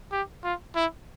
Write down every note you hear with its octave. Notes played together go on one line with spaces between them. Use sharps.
G4
F4
E4